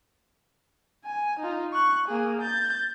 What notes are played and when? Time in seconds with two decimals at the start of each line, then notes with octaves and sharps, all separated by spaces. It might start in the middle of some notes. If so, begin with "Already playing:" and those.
1.06 G#5
1.39 D#4 F4
1.73 C#6 F#6
2.08 A#3 G#4
2.41 G6 A6